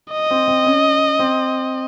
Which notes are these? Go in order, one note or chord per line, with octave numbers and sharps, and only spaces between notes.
D#5
C4
C4
C#4
C4